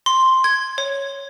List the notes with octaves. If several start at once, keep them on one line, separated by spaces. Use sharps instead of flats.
C6
G#6
C#5